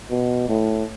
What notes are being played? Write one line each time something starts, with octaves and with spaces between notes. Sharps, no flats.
B2
A2